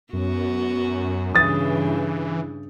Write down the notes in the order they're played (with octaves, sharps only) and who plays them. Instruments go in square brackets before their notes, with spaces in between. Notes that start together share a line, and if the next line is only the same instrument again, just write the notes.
[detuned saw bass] F#2 [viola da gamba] B3 F#4
[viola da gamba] G2 C#3 [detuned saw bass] E3 [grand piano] D#6 A6